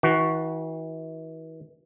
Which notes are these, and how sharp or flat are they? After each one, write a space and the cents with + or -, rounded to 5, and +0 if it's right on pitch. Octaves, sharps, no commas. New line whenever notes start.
E3 -40 F#4 +0